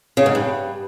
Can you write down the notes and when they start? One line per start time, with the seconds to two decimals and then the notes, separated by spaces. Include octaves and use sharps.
0.17 C#3
0.26 G#2
0.35 G2